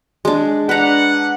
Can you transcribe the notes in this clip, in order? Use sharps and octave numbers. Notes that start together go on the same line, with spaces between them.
G#3 D4
D4 B4 F#5 A#5